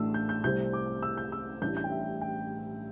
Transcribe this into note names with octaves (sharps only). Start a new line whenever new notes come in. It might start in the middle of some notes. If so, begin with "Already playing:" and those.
Already playing: A1 A2 A3 D4 E6
G6
G6
C2 C3 A3 C4 G6
D6
E6
G6
E6
A1 A2 G3 D4 G6
G6
G5
E5
G5